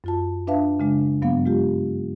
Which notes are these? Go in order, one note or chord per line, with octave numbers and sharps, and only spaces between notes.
F#2 F4 A5
D4 B4 E5 F5 A5
C#3 G#3 D4
G2 F#3 A#3 B3 F5
G#3 F4 G4